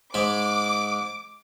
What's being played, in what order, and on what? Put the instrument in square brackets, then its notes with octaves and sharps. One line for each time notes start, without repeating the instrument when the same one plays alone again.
[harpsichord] G#2 G#3 B5 [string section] D6